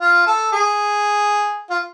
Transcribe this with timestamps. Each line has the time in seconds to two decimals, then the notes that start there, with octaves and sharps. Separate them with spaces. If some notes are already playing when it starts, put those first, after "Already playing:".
0.01 F4
0.27 A4
0.53 G#4
1.70 F4